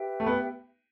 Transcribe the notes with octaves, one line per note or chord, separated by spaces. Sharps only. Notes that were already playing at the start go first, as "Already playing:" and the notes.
Already playing: G4 B4 E5 G5
A3
B3